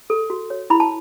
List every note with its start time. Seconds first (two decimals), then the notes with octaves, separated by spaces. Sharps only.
0.10 A4
0.30 F#4
0.50 C#5
0.70 E4 B5
0.80 A5